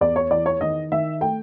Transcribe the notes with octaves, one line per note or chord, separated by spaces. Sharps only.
E2 D5
C#5
E3 D5
C#5
D#3 D#5
D#3 E5
A3 G5